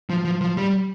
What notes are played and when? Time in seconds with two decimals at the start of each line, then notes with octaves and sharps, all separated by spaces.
0.10 F3
0.25 F3
0.41 F3
0.57 G3